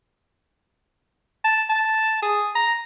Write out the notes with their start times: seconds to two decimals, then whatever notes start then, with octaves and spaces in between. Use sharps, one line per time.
1.44 A5
1.69 A5
2.22 G#4
2.55 A#5